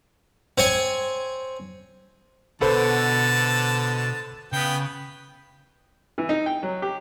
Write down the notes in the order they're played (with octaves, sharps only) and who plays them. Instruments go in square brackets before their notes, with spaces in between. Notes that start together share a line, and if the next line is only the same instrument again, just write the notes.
[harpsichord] C4 C#5 G#5
[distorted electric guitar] B2 F#5 [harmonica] D3 A5 [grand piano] A4 B4 C5
[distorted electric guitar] C#3 [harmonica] B3 G5
[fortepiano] E3
D#4
G5
F#3
G4